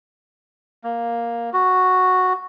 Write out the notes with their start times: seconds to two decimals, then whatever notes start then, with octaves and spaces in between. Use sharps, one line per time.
0.84 A#3
1.53 F#4